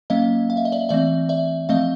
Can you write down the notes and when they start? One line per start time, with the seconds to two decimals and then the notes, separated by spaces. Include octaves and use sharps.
0.10 F#3 A#3 C#4 D#5 F5
0.50 F5
0.57 E5
0.65 D#5
0.72 D5 E5
0.89 E3 A3 C4 D5 E5
1.29 D5 E5
1.69 F3 A3 C4 D#5 F5